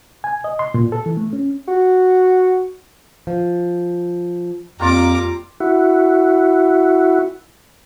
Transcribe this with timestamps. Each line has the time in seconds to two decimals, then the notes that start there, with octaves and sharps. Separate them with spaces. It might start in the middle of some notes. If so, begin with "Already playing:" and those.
0.24 G#5
0.44 D#5
0.59 C6
0.74 A#2
0.92 A4
1.06 E3
1.17 A3
1.33 C#4
1.68 F#4
3.27 F3
4.80 F2 G3 A#3 F4 A#5 D6
5.60 E4 F#4